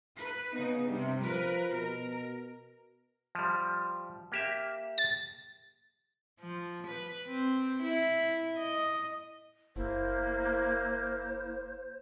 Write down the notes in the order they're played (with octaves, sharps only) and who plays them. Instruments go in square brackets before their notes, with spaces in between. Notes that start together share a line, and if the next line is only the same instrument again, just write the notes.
[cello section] B4
[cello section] C#3 D#4 [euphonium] B3
[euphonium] G2 [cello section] C3 G3
[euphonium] F3 [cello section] A#4 B4
[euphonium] B2 [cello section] A#4
[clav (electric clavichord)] F3 G3
A#3 G4 E5
[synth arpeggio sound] A6
[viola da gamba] F3
B4
C4
E4
D#5
[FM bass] F#1 [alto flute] A#3 [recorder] E4 [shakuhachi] C5